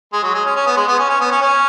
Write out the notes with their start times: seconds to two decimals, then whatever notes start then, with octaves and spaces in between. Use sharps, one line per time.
0.13 G#3
0.23 F#3
0.34 G#3
0.45 C#4
0.56 C#4
0.66 B3
0.77 G#3
0.88 B3
0.99 C#4
1.09 C#4
1.20 B3
1.31 C#4
1.41 C#4